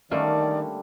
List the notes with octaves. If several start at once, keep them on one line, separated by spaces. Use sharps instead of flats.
D3 D#3 G3 A3 A#3 C#4 D5